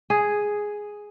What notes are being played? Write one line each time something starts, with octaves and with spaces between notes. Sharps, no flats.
G#4